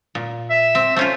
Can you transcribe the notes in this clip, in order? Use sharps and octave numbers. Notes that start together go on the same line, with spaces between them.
A#2
E5
C4
A3 C#4 F4 C5